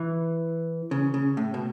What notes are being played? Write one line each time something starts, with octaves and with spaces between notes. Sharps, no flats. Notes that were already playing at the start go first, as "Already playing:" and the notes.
Already playing: E3
C#3
C#3
A2
B2